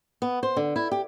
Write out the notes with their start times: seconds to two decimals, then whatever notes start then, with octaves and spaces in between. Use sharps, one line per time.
0.22 B3
0.43 C5
0.56 D3
0.76 E4
0.92 G4